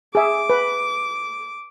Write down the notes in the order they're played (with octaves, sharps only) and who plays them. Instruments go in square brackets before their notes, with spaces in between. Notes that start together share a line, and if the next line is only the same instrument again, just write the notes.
[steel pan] G#4 E5 [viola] D6
[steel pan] B4